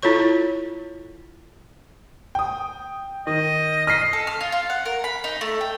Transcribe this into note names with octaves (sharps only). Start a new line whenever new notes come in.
E4 F4 A4 C#5 C#6
G5 D#6
D#3 D#5
D#5 F6 B6 C7
A4
F6
F4
F4
F#5
A#4
B5
D#4
A3
G5